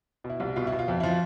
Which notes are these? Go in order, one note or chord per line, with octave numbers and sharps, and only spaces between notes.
B2
E4
C2 F4
B2 F4
E4
B2
F4
F2
F3 E4
F4